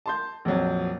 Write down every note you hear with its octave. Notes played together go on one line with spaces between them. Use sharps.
A5 C6 G6
A#1 F2 F#3